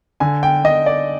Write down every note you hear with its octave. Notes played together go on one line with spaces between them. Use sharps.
D3 G#5
G5
D3 D#5
D5